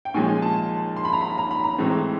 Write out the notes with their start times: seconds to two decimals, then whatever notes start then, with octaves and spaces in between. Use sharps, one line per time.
0.05 G5
0.14 A#2 F3 G#3 C#4 G#5
0.42 A5
0.96 C6
1.05 B5
1.13 A#5
1.21 B5
1.38 A#5
1.51 B5
1.64 A#5
1.78 A2 E3 G#3 C4